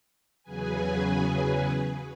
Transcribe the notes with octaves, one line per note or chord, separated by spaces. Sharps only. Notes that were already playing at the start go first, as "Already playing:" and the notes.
E2 C#3 F#3 G#4 B4 G#5